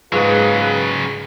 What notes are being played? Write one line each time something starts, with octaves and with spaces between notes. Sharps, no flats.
G#2 C#3 F#3 G#3 F4 G#4 B4